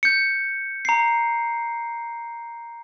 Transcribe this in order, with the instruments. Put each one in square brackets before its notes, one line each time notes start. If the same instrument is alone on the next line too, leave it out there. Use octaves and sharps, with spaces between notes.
[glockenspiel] G6 C#7
A#5 C7